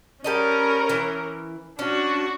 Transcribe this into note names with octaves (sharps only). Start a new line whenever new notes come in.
G3 C#4 A4 A#4 D#5
E3
C#4 D4 F#4